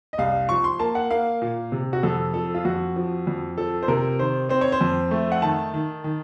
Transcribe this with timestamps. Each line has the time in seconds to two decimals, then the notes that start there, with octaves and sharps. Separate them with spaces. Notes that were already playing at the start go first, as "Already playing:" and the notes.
0.13 D#5
0.18 C2 F5
0.49 F3 C#6
0.64 C6
0.80 A#3 A5
0.95 F#5
1.11 A#3 F5
1.42 A#2
1.72 C3
1.93 F#4
2.03 F2 A4
2.34 F3 A4
2.55 F4
2.65 F2 F#4
2.96 F3
3.27 F2
3.58 F3 A4
3.83 C5
3.88 C3 A#4
4.19 D#3 C5
4.49 C4 C5
4.61 C#5
4.72 C5
4.81 F2
5.11 A3
5.32 F#5
5.42 D#3 A5
5.74 D#3
6.04 D#3